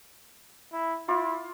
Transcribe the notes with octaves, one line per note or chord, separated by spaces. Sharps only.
E4
E4 F4 D6